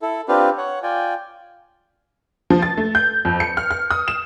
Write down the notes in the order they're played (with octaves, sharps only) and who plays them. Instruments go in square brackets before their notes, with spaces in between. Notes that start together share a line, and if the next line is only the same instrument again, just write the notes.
[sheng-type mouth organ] E4 A4
C4 D4 F4 G4 B4 F5
C#5 F#5
F4 D5 G5 G#5
[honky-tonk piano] F3
A6
A3
G6
F2
C#7
F6
F6
D#6
E7